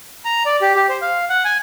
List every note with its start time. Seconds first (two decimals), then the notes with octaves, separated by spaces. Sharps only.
0.25 A#5
0.45 D5
0.62 G4
0.75 G4
0.89 C5
1.01 F5
1.29 F#5
1.45 G#5